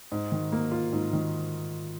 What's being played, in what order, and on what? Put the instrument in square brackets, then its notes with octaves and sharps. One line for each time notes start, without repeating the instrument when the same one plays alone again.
[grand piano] G#2
D#3
A#3
F4
G#2
D#3